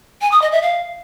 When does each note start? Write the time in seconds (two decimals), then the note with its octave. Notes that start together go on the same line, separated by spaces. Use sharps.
0.21 G#5
0.32 D#6
0.42 D#5
0.52 E5
0.62 F5